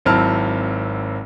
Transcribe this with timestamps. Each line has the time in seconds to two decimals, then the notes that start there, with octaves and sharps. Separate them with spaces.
0.05 G#1 F#3 C4 E4 A5 F6